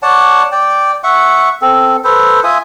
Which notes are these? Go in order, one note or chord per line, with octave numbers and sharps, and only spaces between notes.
C#5 D5 F#5 A5
D5 G5
E5 F#5 C#6
C4 A4
A4 B4 C5
F4 E5 G#5 D#6